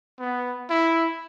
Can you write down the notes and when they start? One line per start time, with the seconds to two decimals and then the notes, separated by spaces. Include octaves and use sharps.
0.19 B3
0.70 E4